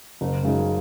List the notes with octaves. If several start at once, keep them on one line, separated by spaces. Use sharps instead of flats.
F#1
F#2 C#3 G#3 D#4